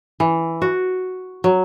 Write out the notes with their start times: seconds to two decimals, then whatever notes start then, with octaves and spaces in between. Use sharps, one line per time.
0.20 E3
0.62 F#4
1.44 F#3